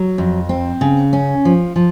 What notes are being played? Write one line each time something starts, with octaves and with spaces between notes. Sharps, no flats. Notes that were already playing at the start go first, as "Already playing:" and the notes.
Already playing: F#3
F2
C4
C#3
C#4
F3
F3